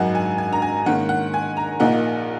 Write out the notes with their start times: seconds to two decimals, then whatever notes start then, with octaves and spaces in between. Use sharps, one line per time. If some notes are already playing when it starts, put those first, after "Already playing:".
Already playing: G#1 F#2 F#3 D#4 F#5
0.15 G#5
0.38 G#5
0.53 A#5
0.62 G#5
0.86 G#2 D#3 A#3 C#4 F#5
1.09 F#5
1.34 G#5
1.57 A#5
1.80 A#1 A#2 A#3 D#4 F#5